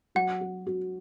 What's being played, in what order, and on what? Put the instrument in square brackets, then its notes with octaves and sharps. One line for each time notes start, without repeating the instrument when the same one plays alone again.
[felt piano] F#3 [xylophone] F#5
[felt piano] F#4
F#4